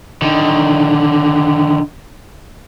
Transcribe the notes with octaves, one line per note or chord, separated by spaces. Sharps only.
D3 D#3